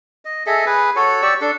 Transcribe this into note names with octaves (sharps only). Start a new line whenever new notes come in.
D#5
G#4 A4 D#5 E5
G#4 B4
F#4 A4 C#5
G4 D5 C#6 E6
D4 A4